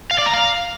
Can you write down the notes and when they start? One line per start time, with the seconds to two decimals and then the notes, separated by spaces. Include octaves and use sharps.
0.11 F5
0.18 D5
0.26 A#5
0.34 F5